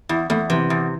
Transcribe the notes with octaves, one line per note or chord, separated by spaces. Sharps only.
E2 E4
E2 A3
C3 E3
E2